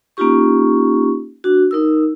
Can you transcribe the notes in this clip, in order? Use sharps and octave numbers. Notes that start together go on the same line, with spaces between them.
A#3 C#4 D#4 F4 G4 C#6
D4 F#4
D#4 A#4 E6